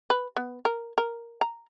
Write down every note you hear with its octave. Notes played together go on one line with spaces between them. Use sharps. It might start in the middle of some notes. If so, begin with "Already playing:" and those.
B4
B3
A#4
A#4
A#5